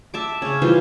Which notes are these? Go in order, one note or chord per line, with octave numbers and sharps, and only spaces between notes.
E5 A5 D6
C#3 C#4
E3 G3 F4 C5